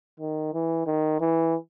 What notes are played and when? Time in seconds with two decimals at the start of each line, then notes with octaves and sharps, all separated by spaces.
0.20 D#3
0.53 E3
0.87 D#3
1.20 E3